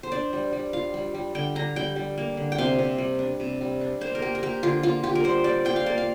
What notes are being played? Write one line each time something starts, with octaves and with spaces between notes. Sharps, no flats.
C5
D4 D5
G3
G3
F4 F5
G3
G3
D3 G5
D3 A#5
G3 G5
G3
A#3
D3
G5
C3 F5
C3
G3
D4
C3
G3
D4
A#3 C5
A#4
A#3 G4
A#4
A#3 G4
D3 F4
A#3 F4
F4 G4
A#4
G3 C5
G3 D5
F4 G5
F5
A#3 D5
F5